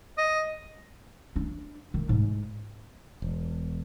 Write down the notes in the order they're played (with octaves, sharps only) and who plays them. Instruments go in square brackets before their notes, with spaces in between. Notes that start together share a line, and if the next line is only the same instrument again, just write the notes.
[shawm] D#5
[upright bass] D4
D#3
G#2
[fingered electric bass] E1